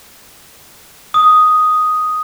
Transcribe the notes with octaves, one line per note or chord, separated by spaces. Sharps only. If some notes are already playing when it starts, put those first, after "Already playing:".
D#6